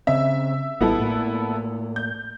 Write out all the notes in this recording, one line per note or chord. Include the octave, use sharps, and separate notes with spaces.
C#3 C4 E5
A1 G3 B3 E4 A4
A2 A#3
G6